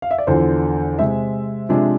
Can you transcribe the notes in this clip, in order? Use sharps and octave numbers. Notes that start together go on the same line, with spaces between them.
F5
E5
D5
E2 D3 F3 C5
C3 G#3 C4 E5
C3 F3 G#3 D4